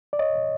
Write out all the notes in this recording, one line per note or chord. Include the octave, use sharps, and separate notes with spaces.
D5
C#5 D#5